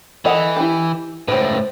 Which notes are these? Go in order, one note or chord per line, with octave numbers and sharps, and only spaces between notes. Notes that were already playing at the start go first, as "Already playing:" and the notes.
E3 A4 D#5 F#5
E4 G4
C#2 A2 B4 C5